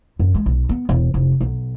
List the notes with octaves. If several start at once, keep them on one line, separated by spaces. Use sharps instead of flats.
F#2
G#3
B1
B3
E1
F1
B1